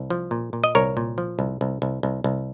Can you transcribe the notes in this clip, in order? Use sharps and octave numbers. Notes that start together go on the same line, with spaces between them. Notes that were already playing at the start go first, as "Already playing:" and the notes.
Already playing: C2
F3
A#2
A#2
D#5
C2 A#4 C#5
A#2
F3
C2
C2
C2
C2
C2